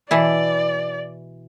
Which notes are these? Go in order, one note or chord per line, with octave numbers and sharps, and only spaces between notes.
B2 E3 E4 D5